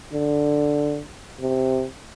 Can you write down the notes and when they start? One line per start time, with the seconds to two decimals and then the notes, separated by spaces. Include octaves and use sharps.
0.13 D3
1.40 C3